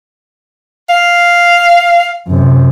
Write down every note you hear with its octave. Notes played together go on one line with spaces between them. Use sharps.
F5
F#2 C3